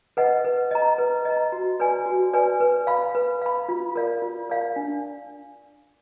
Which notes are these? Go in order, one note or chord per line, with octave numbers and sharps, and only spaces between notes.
B4 D#5 F#5
B4
D#5 A#5
B4
D#5 A#5
F#4
B4 D5 G#5
F#4
B4 D5 G#5
B4
F5 B5
B4
F5 B5
F4
A#4 D5 F5
F4
A#4 D5 F5
D4